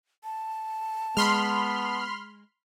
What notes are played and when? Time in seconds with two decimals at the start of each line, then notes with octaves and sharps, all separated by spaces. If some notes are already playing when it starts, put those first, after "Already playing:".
0.24 A5
1.17 G#3 B3 B5 C6 F6